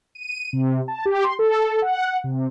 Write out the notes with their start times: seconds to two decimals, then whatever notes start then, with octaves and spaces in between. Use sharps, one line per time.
0.15 D#7
0.53 C3
0.88 A5
1.06 G4
1.24 C6
1.39 A4
1.82 F#5
2.24 C3